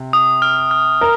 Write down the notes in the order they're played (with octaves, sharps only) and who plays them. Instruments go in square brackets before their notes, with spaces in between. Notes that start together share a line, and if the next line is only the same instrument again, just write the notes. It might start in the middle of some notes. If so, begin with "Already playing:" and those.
Already playing: [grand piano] C3
[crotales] D#6
F6
F6
[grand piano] A#4